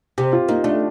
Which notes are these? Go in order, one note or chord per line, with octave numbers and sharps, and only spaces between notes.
C3 G4
F4
A#3 D#4
A3 D4